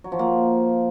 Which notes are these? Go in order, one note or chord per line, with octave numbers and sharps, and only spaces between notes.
F#3
F3
A#3